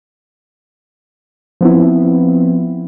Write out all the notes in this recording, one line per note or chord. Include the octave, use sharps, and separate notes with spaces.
F3 B3 C4 E4